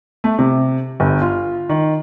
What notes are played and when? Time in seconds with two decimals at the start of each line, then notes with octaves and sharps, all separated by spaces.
0.24 A3
0.39 C3
1.00 G1
1.22 F4
1.69 D#3